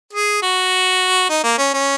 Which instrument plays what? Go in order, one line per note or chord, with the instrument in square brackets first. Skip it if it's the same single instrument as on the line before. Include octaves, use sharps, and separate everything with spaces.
[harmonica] G#4
F#4
D#4
A#3
C#4
C#4